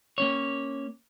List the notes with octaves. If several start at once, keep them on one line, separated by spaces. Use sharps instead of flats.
A#3 C#4 C#5